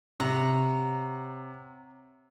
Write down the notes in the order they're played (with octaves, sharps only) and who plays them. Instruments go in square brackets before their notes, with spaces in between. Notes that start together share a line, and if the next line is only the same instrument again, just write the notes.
[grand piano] C3 [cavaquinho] C#5 F#5 A#5